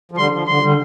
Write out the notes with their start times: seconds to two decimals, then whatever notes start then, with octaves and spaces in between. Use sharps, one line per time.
0.11 F3
0.17 D3 G3 C6
0.33 F3
0.47 D3 C6
0.62 D3 G3